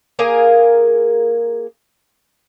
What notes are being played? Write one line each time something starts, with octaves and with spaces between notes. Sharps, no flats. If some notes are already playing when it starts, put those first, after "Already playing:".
A#3 G#4 A#4 F5